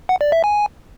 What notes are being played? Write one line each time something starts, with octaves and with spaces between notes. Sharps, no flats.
F#5
D5
E5
G#5